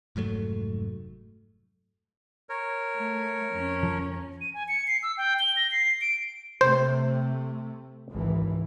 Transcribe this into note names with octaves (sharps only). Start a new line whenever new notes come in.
F1 G#2 F#3 A3
A#4 C#5
A3
F2 C#4
F3
D#7
G#5
C#7
C7
E6
G5
G7
A#6
C7
D7
C3 A3 C5
G#1 C#2 E3